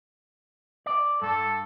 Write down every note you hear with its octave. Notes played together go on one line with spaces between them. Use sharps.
D5
G2 A4